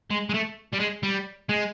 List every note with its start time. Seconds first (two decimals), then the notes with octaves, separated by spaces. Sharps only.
0.10 G#3
0.29 G#3
0.34 A3
0.73 G3
0.80 G#3
1.03 G3
1.49 G#3